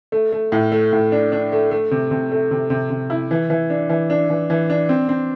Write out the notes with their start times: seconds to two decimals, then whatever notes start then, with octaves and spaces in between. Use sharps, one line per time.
0.12 A3
0.32 A3
0.52 A2
0.72 A3
0.92 A2
1.12 D4
1.32 D4
1.52 A3
1.71 A3
1.91 C3
2.11 C3
2.32 A3
2.51 C3
2.70 C3
2.90 C3
3.10 E4
3.31 E3
3.50 E3
3.70 D4
3.89 E3
4.10 D4
4.30 E3
4.50 E3
4.70 D4
4.89 C4
5.09 C4